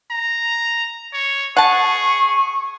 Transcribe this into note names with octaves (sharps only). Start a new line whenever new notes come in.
A#5
C#5
G#4 F#5 A5 C#6